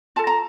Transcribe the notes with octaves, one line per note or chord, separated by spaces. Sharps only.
F4 A4 A5
A#5